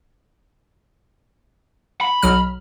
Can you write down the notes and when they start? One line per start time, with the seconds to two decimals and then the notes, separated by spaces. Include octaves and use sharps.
2.01 B5
2.23 B1 F#3 F6